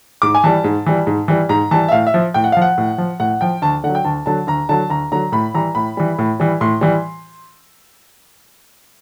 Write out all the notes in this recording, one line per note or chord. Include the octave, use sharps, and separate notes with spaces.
G#2 D6
G#5
E3 G3 A5
G#2
E3 G3
G#2
E3 G3
G#2 A#5
E3 G3 A5
E5
A2 F5
E5
F3
A2 G5
F#5
F5
F3
F#5
A2
F3
A2 F#5
F3 G5
D2 A5
D3 F#5
F#3
G5
D2 A5
D3 F#3 A5
D2 A#5
D3 F#3 A5
D2 A#5
D3 F#3 A#5
A2 B5
E3 G3 A#5
A2 B5
E3 G3
A2
E3 G3
A2 C6
E3 G3